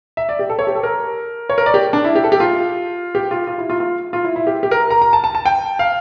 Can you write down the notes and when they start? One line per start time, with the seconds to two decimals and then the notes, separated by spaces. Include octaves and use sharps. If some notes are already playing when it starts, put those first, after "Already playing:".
0.17 E5
0.29 D5
0.39 G4
0.50 A4
0.59 C#5
0.67 G4
0.75 A4
0.83 A#4
1.50 C#5
1.58 A#4
1.66 D5
1.74 G4
1.93 D4
2.04 E4
2.15 G4
2.24 A4
2.32 G4
2.40 F4
3.15 G4
3.31 F4
3.47 F4
3.58 E4
3.70 F4
3.80 F4
4.13 F4
4.24 E4
4.36 E4
4.47 G4
4.63 G4
4.71 A#4
4.90 A#5
5.02 A#5
5.13 A5
5.24 A5
5.35 A5
5.45 G5
5.79 F5